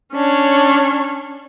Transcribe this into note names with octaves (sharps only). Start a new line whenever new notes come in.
C#4 D4 C#5